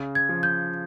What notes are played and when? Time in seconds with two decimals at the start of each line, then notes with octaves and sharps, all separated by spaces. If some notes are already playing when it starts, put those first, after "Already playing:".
Already playing: C#3
0.15 G#6
0.29 F3
0.43 G6